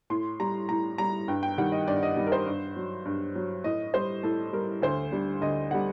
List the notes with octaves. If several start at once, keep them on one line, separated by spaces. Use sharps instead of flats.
A2 C6
G3 A#5
A2 A#5
G3 A#5
G2 G5
G5
D#3 G3 F#5
D#5
G2 D5
D#5
D#3 G3
A#4
C5
G2
F#3
G2
F#3
A2 D#5
G3 C5
A2 A4
G3 A#4
D2 C5
D3 G3
D2 D#5
D3 G3 F#5